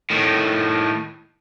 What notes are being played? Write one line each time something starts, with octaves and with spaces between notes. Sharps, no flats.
A2 D#3